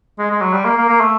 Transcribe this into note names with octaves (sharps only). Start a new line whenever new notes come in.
G#3
G#3
F#3
G3
A#3
A#3
A#3
A3